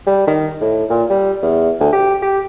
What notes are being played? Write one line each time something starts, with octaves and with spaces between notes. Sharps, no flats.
G3
D#3
A2
A#2
G3
E2
D2
G4
G4